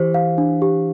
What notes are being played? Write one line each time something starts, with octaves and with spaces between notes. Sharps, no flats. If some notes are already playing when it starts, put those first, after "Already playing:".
Already playing: E3 G4 C5
F5
D4
G4